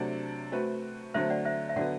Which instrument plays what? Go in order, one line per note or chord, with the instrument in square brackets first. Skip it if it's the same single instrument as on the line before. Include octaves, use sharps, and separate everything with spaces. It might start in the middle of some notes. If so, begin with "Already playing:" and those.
Already playing: [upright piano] C3 F#3 A3 D4 A4 [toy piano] D5 F#5
[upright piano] A3 C4 F#4 B4
[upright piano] D3 F#3 A3 C4 [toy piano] C5 E5
[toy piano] D5 F#5
C5 E5
E5
[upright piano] D3 F#3 B3 [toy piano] D5 F#5